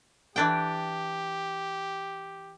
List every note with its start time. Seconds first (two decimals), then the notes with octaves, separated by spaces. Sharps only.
0.36 E3 D4 G4 G5